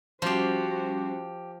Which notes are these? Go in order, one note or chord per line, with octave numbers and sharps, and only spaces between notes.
F3 G3 C#4 F#4 G4 C5 C6 D6